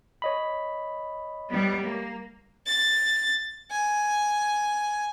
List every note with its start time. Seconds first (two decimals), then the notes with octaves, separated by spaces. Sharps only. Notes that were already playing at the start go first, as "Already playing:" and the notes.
0.22 C#5 D#5 B5
1.50 G3 B3
1.82 A#3
2.67 A6
3.71 G#5